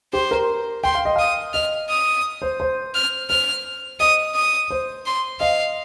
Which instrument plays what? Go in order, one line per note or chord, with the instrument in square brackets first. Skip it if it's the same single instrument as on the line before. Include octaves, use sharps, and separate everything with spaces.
[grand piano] G4 [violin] C5
[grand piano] A#4
[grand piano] G5 [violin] C6
[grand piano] F5
D#5
[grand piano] F5 [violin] D#6
[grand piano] D#5 [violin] F6
[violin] D#6
[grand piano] C5
C5
[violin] F6
[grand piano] C5 [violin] F6
[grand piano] D#5 [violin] D#6
[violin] D#6
[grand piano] C5
[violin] C6
[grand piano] D#5 [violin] F5